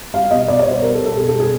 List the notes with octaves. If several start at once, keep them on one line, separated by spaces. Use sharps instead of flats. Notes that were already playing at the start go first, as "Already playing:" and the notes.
G3 F5
B2 D#5
B2 D5
C#5
G3
C5
G3 A#4
A4
B2
A4
B2 G#4
A4
G3
G#4